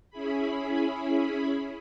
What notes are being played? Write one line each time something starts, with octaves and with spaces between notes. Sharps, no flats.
C#4 E4 G#4 B5